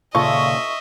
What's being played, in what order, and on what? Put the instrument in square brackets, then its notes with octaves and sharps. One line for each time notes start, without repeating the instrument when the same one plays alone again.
[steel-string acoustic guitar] D#2 A#2 C#3 [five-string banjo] F4 A4 [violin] D#5 E5 [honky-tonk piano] C#6